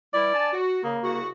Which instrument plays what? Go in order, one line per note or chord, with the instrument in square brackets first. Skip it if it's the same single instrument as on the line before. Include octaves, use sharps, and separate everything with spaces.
[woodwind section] E3 G3 E4 [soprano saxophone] D5
[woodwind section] D4 G#5 A5
F#4
[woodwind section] C#3 [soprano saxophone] A#3
[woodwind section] C2 C#3 F#4